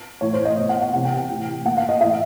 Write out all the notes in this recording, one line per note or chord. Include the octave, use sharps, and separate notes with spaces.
A2 E3 C#5
C5
D#5
B2
F#5
F#5
C3 E3 F#5
G5
G5
A2 E3
A#2 F#5
F5
D#5
A2 E3 E5